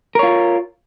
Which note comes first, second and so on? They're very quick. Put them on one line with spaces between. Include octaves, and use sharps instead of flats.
A#4 C#5 F4